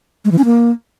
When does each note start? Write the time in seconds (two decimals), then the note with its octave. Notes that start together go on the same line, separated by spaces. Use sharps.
0.25 G#3
0.31 E3
0.38 C#4
0.45 A#3